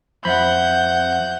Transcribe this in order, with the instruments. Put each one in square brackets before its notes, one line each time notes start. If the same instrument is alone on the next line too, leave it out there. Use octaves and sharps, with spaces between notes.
[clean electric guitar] F2 B5 [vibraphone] C5 E5 [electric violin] F#5 G6